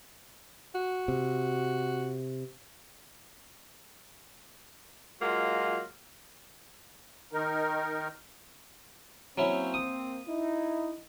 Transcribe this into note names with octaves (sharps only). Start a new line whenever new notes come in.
F#4
C3
F#3 G#3 A#3 F4
D#3 D#4 A#4
F#3 A#3 C4 C#4 E4
D#6
D#4 E4